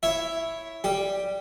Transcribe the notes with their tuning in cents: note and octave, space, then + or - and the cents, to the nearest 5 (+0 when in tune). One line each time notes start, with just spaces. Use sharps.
E4 +0 C#5 -5 E5 +5
G3 +0 G4 +0